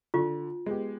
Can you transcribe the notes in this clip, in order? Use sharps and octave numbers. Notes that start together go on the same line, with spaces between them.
D3 F4
G#3 B3 G4